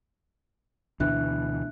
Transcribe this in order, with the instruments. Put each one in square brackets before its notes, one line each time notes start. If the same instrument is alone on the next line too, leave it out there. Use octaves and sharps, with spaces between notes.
[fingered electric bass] D2 B2 E3 [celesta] D4 E5 F#6